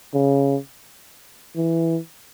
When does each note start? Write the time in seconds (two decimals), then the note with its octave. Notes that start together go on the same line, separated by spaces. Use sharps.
0.14 C#3
1.56 E3